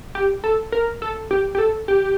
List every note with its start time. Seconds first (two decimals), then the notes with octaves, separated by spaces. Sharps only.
0.15 G4
0.44 A4
0.72 A#4
1.02 A4
1.31 G4
1.55 G4
1.58 A4
1.88 G4